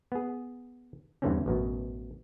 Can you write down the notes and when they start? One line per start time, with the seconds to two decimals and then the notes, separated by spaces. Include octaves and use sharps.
0.12 B3 G#4
1.22 E2 G2 D3 E3 C4 C#4
1.46 A1 F#2 B2